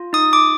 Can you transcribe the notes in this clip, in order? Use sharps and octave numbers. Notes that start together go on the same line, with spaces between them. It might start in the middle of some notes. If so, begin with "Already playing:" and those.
Already playing: F4
D#4 D#6
D6